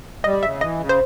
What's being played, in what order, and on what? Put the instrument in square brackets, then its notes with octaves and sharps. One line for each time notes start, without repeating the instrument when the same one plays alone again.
[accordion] G3 [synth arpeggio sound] D#5
[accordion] C#3 [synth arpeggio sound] E5
[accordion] E3 [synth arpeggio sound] D#5
[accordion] C#3
[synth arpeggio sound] C5